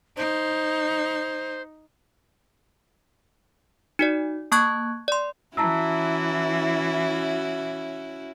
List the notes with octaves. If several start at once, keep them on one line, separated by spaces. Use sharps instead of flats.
D#4 C5
D#4 F#4 D5
A#3 A5 C#6 F#6 G#6
D5 C6
E3 C#4 E4 F#4 A5 A#5 E6